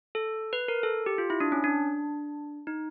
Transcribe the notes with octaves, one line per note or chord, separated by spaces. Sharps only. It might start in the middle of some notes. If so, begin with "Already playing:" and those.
A4
B4
A#4
A4
G4
F4
E4
D4
C#4
D4
D#4